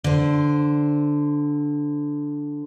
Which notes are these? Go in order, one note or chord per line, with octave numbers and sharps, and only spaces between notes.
D3 C5